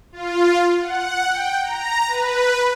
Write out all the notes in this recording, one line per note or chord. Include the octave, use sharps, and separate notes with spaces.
F4
F#5
G5
A#5
B4